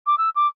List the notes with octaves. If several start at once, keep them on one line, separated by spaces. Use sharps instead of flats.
D6
E6
D6